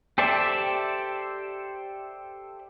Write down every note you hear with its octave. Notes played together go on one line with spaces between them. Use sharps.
G4 A4 C5 D5 E5